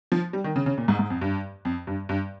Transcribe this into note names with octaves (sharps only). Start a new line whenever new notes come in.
F3
G3
D#3
C#3
C#3
A#2
G#2
G#2
F2
G2
F2
G2
G2